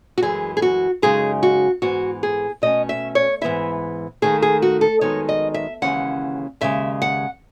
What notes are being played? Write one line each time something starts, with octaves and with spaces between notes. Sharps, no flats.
F#4
F#2 E3 G#3 G#4
G#4
F#4
F#2 C#3 G#3 D#4 G#4
F#4
G#2 E3 B3 F#4
G#4
B2 A3 C#4 D#5
E5
C#5
G#2 E3 B3 E4 E5
D#2 D#3 A3 G#4
G#4
F#4
A4
F#2 D#3 G#3 B3 D#4 C#5
D#5
E5
D#2 C#3 E3 G#3 C#4 F#5
D#2 C#3 G#3 E5
F#5